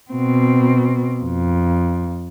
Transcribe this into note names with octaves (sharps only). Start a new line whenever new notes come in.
B2 C4
F2